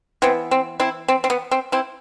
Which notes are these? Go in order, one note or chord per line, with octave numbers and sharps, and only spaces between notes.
E3 B3 C4
C4
C4 E4
C4
C4
B3
C4
C4 E4